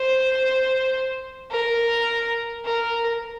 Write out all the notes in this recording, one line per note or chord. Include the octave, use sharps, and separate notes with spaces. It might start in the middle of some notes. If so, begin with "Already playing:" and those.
Already playing: C5
A#4
A#4